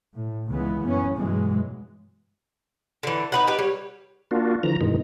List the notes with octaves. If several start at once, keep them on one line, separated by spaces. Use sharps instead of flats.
A2
C#2 C#3 E3 G#3 B3
F#2 B3 C#4
G2 B2 E3 F#3 G#3
D3 E3
D#4 B4 F#5
G4 B4
G3 C#5
A#3 D4 F4 F#4
D3 E3 F3 A#5
G2 B2 D#3 E3 G#3